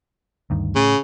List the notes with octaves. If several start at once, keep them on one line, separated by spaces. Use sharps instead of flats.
D2 G2 D#3
A2 C#3